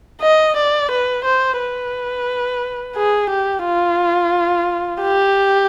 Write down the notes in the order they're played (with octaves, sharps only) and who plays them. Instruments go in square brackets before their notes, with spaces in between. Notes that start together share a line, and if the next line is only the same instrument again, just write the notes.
[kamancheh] D#5
D5
B4
C5
B4
G#4
G4
F4
G4